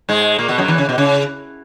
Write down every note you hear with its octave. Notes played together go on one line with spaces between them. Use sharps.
G#2 G#3
A#2 A#3
B2 B3
F#2 F#3
E2 E3
C#3
B2
C#3